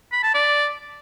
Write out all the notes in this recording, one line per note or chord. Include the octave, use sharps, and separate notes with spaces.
B5
A5
D5